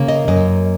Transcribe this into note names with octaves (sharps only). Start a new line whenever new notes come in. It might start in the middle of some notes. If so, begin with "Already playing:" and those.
Already playing: C#3 A#3
D#5
F#2 D#5